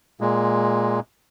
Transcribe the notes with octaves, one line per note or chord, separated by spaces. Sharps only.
A#2 G#3